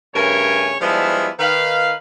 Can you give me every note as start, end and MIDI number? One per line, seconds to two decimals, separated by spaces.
0.13 0.75 43
0.13 0.75 49
0.13 0.75 57
0.13 0.75 70
0.13 0.75 73
0.13 0.75 80
0.80 1.27 53
0.80 1.27 55
0.80 1.27 56
0.80 1.27 59
0.80 1.27 62
0.80 1.27 64
1.38 1.93 51
1.38 1.93 71
1.38 1.93 77